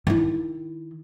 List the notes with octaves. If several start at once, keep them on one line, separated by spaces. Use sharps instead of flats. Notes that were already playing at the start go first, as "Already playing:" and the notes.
D#3 E4